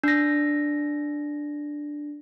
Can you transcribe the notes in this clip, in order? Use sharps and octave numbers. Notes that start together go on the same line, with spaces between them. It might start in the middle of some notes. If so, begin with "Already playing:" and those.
D4 A#6